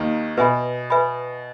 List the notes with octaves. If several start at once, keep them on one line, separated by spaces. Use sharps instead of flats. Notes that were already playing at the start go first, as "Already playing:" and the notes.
Already playing: D#2 D#3
B2 B4 E5 G#5 B5
B4 E5 G#5 B5